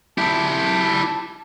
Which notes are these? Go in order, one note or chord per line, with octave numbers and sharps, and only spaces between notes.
E4 G4 A5